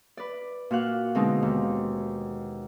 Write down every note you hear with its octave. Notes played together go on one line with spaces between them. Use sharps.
B4 D5
A#2 F#4 F5 F#6
B2 D3 G#3 C4 D#4
D#2